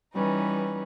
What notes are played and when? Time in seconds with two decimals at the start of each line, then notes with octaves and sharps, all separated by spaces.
0.14 E3 G3 C#4 D#4 B4